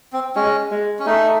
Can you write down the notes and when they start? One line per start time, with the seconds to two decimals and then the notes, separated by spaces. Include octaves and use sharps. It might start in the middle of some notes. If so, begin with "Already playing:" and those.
0.13 C4
0.36 G#3 C#4
0.72 G#3
0.99 C#4
1.06 A3 D#4